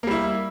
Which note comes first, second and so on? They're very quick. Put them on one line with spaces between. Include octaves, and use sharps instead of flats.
A#3 G3 E4